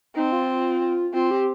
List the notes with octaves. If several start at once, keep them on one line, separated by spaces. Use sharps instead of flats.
C4 D#4
F4
C4 F4
G4